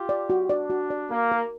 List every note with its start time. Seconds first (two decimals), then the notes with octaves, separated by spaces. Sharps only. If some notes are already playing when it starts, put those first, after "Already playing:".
Already playing: F4 G4
0.09 D5
0.30 F#4
0.49 D4 D5
0.70 F#4
0.90 D5
1.10 A#3 A#4
1.32 A#4